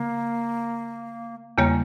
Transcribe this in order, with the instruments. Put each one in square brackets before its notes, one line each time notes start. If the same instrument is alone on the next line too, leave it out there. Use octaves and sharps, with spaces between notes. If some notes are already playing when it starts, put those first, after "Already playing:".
Already playing: [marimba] C#3 [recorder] A#3
[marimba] E2 C#3 G3 A#3